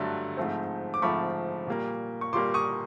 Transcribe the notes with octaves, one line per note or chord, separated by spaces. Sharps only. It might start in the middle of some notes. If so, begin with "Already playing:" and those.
Already playing: G2 D3 F#3 A3
G#2 F3 A3 C4
D6
G#2 F3 A3 C4 B5 C#6
A#2 G3 A#3
C#6
A#2 G3 A#3 C6 D6
C#6 D#6